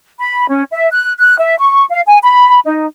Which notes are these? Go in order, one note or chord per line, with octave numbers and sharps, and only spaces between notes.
B5
C#4
E5
F#6
F#6
E5
C#6
F5
G#5
B5
D#4